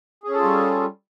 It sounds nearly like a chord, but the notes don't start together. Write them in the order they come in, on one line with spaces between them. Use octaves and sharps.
G#4 C#4 A4 F4 G3